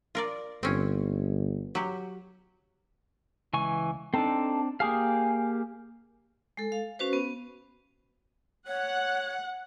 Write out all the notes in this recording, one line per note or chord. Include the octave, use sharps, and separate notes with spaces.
F4 A#4 D5
G1 C4 C#4
F#3 G4
C#2 E3 G#5 C#6
C4 D4 D#4 A4
A#3 G4 G#4 F5
G#3 A4
F5
C#4 F#4 B4 C5
B3
C#5 F#5